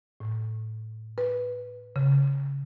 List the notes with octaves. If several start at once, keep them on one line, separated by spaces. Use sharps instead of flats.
A2
B4
C#3